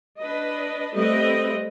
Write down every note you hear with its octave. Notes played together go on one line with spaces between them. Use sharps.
D4 B4 D#5
G3 A3 C4 B4 D#5 E5